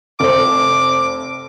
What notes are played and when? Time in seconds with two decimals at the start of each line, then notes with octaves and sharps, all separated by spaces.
0.20 F1 C5 D6